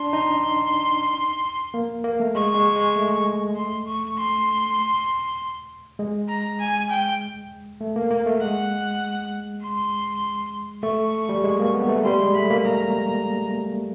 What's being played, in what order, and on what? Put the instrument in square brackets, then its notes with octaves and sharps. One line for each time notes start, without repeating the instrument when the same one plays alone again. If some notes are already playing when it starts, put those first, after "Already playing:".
Already playing: [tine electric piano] D4 [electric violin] C6
[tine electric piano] D#4
A#3
A#3
A3
[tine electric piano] G#3 [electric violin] C#6
[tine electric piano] G#3
G#3
A3
[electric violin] C6
C#6
C6
[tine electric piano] G#3
[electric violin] A#5
G#5
G5
[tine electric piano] A3
A#3
A#3
A3
[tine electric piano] G#3 [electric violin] F#5
[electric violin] C6
[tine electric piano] A3 [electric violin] C#6
[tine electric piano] G3
G#3
A#3
B3
A3
[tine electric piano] G3 [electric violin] C6
[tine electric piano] G#3
[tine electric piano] A3 [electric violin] B5
[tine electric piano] A#3
[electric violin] A#5